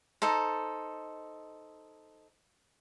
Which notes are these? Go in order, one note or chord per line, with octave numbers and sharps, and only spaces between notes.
D#4 A4 C5